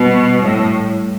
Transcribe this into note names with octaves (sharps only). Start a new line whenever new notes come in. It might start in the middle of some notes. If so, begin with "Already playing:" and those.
Already playing: B2 G3
A2